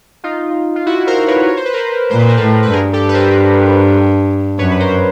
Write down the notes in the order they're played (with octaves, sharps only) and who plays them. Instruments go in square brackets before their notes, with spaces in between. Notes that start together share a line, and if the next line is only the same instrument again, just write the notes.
[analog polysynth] D#4 F4
F4
E4 F#4
A#4 C5
B4 C#5
C#5
C5
B4
A#4 C5
[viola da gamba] A#2 [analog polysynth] C5
[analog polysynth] B4
A#4
[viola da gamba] A2 [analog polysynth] A4 B4
[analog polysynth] B4
[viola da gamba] G2 [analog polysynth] G#4 A#4
[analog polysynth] G4 A4
B4
A#4 C5
[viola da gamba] F#2 [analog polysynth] B4 C#5
[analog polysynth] B4
A#4 C5